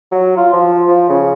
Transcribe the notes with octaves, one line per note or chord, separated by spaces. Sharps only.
F#3
F4
F3
F3
C#3